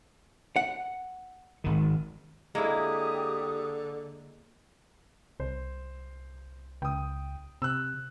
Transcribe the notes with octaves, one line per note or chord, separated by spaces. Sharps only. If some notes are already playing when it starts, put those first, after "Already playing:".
F#5
G#1 D#3
D3 G#3 A#3 E4 G4 D#6
C2 C5
C#2 G5 D#6
C3 E6 F#6